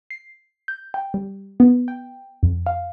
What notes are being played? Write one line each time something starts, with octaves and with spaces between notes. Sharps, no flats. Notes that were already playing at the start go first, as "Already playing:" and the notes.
C7
G6
G5
G3
B3
G5
F2
F5